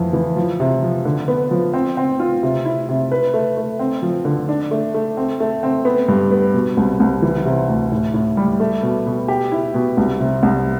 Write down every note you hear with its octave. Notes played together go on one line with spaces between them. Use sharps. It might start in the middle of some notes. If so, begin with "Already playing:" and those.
Already playing: F2 E3
E3
F3
C3
F3
D3
B3
F3
C4
C4
F4
C3
E4
C3
B4
A3
A3
C4
F3
D3
D4
A3
A3
C4
A3
C4
B3
G2
B3
B2
C2
C2
E3
C3
D2
A2
A2
G3
A3
B2
B2
G4
E4
B2
C2
C3
C2